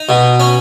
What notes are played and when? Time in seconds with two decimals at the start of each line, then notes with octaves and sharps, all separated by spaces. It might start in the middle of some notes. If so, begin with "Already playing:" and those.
Already playing: D#4
0.09 B2
0.40 C#4